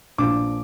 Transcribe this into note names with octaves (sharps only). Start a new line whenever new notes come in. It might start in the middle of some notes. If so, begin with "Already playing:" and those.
A#1 A#2 F3 D6